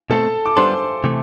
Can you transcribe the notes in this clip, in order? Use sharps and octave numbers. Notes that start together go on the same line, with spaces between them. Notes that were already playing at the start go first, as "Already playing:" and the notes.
B2 A3 C4 A4 A5
D6
G3 B3 D4 A4 C5 C6
C3 E3 A3